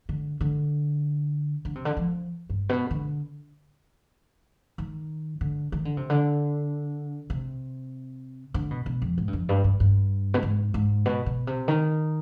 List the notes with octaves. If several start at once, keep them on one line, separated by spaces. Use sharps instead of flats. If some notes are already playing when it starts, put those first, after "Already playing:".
D3
D3
D3
C3
D3
F3
G2
B2
D3
D#3
D3
D#3
D3
C3
D3
C3
D3
B2
B2
F2
G#2
G2
F2
G2
G2
G2
B2
G#2
G#2
B2
B2
C3
D#3